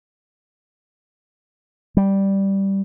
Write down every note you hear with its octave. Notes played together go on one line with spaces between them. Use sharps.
G3